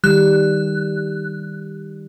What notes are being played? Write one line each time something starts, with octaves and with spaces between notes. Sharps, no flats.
D#3 G3 F#6